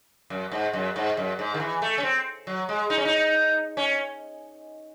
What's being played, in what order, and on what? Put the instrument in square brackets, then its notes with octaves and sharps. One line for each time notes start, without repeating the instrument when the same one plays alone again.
[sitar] F#2
G#2
F#2
G#2
F#2
G#2
D#3
E3
A3
C#4
C4
F#3
G#3
D#4
C#4
D#4
C#4